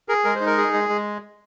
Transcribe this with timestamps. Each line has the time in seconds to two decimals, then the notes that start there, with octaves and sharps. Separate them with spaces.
0.08 G#4 A#4
0.24 G#3 A#4
0.35 C5
0.41 D#4
0.46 A#4
0.58 G#4
0.74 G#3
0.89 G#3